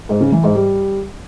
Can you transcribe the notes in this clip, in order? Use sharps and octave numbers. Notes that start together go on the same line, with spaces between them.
G#2
C#3
E3
G#2
G3